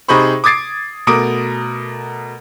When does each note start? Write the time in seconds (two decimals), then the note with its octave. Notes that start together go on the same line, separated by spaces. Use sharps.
0.08 C3 D#4 G#4 C5 B5 C#6
0.44 D6 D#6 G#6 A6 C7 D7
1.07 B2 A3 A#4 D6 D#6 D7